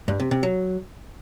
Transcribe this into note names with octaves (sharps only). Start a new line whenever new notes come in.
G2
C3
C3
F#3